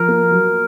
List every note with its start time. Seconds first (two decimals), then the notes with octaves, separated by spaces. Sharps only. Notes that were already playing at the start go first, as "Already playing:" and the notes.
Already playing: F3 A#4
0.08 A#3
0.32 F#3